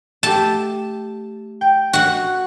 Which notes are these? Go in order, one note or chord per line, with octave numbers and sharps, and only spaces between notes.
A3 G4 A5
G5
F#4 F#5